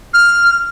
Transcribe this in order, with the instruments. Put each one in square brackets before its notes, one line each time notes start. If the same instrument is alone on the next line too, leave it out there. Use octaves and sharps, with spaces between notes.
[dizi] F6